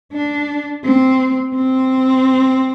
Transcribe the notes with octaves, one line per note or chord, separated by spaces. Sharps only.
D4
C4
C4